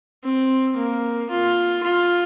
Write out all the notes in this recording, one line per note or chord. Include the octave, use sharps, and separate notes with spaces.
C4
A#3
F4
F4